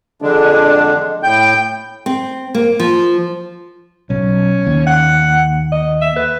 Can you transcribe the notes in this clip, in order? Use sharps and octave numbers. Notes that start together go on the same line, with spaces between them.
F2 D3 G#3 D4
A2 G5 G6
C4
A#3
F3
B1 C#4
D#2
F#5
D#5
E5
B4